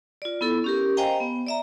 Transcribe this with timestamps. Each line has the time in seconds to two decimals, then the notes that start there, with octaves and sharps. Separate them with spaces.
0.22 F4 D5
0.41 B3 E4 A4
0.64 C#4 G4 A#4
0.97 C5 D#5 F5 G5 G#5 A#5
1.20 B3
1.47 D5 E5 A#5